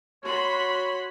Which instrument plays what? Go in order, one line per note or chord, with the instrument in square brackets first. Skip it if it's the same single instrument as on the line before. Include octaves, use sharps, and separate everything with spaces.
[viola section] F#4 B5 C6 [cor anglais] C#5